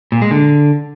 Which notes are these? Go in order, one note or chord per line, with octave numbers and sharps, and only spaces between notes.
A#2
G#3
D3